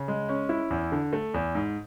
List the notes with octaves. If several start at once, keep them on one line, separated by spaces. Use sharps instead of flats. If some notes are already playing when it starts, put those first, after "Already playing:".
Already playing: C#3
G#3
C#4
E4
E2
D3
A3
E2
G#2